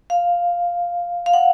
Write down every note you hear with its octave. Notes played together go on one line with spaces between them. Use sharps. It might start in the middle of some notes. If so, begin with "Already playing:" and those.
F5
F5
F#5